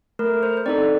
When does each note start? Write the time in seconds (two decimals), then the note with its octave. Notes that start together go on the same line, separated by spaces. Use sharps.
0.19 A3 A#4
0.43 C5
0.57 C5
0.66 C4 D#4 A4 D5